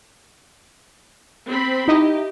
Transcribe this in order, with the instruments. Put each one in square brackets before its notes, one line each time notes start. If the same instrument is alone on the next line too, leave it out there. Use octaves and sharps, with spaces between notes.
[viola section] C4 B5
[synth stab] D#4 E4 D#5 [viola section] G4